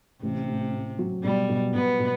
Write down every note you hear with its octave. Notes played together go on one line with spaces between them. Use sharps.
A1 C3
A2
A2
F#3
B2 G3
B2
B2 B3
B2